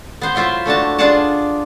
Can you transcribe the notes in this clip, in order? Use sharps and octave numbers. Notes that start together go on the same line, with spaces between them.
B3 C5
F#3 E4 F4 C5 E5
A3 D4 F#4 A5
D4 F4 G#4 D5 F#5 A5